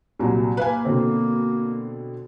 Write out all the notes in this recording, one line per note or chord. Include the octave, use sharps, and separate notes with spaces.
C2 A#2 F#3
A#3 B4 F5 G#5
B2 D3 C4